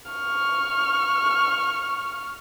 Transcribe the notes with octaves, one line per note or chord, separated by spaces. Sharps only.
C#6 F6